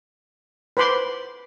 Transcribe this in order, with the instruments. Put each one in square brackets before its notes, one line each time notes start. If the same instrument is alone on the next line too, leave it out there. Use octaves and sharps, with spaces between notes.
[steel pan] B4 C5 B5 C6 D6